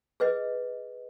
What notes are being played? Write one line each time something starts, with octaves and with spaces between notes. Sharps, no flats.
G#4 B4 D#5